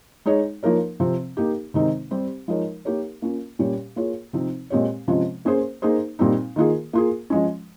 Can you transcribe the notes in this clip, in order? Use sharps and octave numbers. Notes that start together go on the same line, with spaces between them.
G#3 D#4 G#4 C#5
F3 A#3 D#4 A#4 C#5
C3 F3 C4
A#3 D#4 G4
C3 D#3 G#3 C4 D#4
G3 C4 G4 C5
F3 G#3 D#4 A#4 C#5
A#3 D#4 G4 A#4 C#5
A#3 C#4 F4
A#2 G3 C#4 G4 C#5
A#3 F4 G#4 C#5
C3 F3 C4 D#4
A#2 G#3 C4 G4 C#5
C3 F3 G#3 C#4 F4
A#3 C#4 G#4 C5
A#3 D#4 G#4 C5
A#2 G3 C4 D#4
D#3 A#3 F4 G#4
A#3 F4 G#4
F3 G#3 C#4